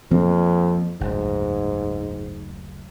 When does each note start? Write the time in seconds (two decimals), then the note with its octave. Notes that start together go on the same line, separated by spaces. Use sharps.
0.11 F2 F3 A#3 C4
1.01 F#1 D2 G#2